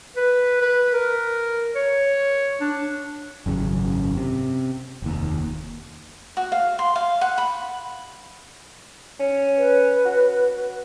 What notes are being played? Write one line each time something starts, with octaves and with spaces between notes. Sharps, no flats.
B4
B4
A#4
C#5
D4
G#1 F#2 C#3
C3
F1 D#2
F#4
F5
C6
F5
F#5
B5
C#4
B4
F#4